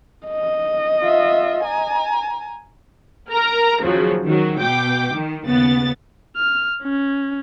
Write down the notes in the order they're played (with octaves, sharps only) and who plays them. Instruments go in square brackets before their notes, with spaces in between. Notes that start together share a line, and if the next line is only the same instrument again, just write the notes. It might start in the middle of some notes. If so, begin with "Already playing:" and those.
[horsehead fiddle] D#5
[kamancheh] F4 E5
G#5 A#5
[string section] A#4 A#5 F6
D#2 C#3 F3 F#3
D#3 F#3
B2 G5 D6
D#3
D#2 C#3 B3 A6
[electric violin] F6
C#4